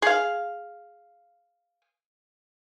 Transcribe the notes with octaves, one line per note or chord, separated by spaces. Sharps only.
G#4 F5